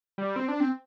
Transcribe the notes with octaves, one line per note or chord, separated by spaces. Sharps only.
G3
C4
D4
C4